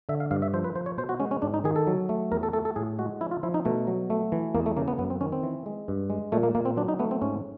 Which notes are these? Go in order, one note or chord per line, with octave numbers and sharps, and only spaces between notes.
D3 E5
F5
G2 F5
E5
F3 C5
B4
F3 C5
C#5
B2 C5
F#4
G#3 C#4
C#4
G#2 D4
D#4
D#3 G#4
A4
F#3
A3
E2 A#4
A4
A3 A4
A4
A2 G#4
G#3 F#4
F3 E4
F4
F3 E4
D#4
B2 A3
F#3
A3
E3
E2 A#3
A3
C#3 A#3
B3
F#2 B3
C4
D#3 C#4
C4
E3
G#3
G2
G#3
A#2 A3
A#3
A#2 A#3
C4
F#3 D4
D#4
A3 B3
C4
G#2 C#4